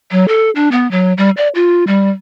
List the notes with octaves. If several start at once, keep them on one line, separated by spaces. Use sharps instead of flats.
F#3
A4
D4
B3
F#3
G3
D5
F4
G3